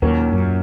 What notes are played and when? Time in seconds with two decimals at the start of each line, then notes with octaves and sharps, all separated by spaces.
0.02 D#2 A#2 D#3 F#3 A#3 C#4
0.33 F#2